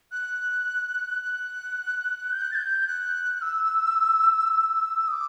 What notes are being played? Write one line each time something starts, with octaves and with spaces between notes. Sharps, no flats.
F#6
F#6
G6
F#6
A6
G6
F#6
E6
D#6
D6